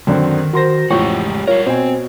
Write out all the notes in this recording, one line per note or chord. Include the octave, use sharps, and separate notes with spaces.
F#2 D3 D#3 C4
F#4 A#4 C5 C6 A#6
A1 F2 G#3 G4 C#5 F#5 G5 C#6
G3 F4 A#4 C#5
B2 C4 C5 G#5